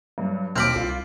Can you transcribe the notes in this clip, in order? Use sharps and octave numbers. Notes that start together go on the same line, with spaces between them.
G2 F#3
D#2 B2 C4 B5 D6 F6
C2 F4